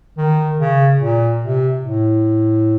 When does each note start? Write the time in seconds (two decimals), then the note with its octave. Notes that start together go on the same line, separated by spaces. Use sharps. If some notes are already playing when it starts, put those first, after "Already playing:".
0.17 D#3
0.59 C#3
1.00 A#2
1.41 C3
1.83 A2